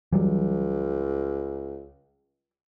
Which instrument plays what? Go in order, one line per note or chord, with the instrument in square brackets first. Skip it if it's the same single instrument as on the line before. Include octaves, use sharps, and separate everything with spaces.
[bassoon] C#2 [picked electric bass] E3 F#3 G3